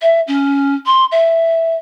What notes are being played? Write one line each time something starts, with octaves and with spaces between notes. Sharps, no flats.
E5
C#4
C6
E5